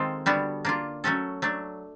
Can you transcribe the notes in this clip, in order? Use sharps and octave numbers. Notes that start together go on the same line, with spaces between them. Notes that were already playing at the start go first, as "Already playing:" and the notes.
Already playing: D#3 G#3 C4 F4 A4
D3 G3 B3 D4 F#4
A#3 D4 F4
F#3 A3 C#4 F#4 A4
F#3 A3 D4